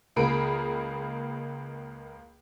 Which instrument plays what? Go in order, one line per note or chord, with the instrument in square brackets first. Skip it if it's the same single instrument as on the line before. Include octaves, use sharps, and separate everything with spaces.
[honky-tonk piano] C#2 A#3 G#4 A#4 B5 D7